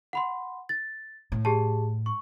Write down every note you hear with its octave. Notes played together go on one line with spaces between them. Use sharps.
F#5 B5 C6
A6
A2
G4 G#4 A5
C#6